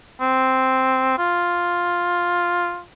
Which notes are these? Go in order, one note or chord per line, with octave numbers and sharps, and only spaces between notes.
C4
F4